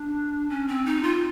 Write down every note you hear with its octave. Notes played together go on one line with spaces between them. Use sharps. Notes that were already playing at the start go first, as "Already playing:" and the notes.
Already playing: D4
C#4
C4
D#4
F4